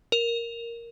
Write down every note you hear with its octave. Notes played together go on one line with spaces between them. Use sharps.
A#4